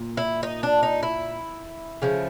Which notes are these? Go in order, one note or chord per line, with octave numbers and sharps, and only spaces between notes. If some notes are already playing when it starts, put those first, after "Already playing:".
Already playing: A#2
E4
D#4
D4
D#4
E4
C#3 F3 A3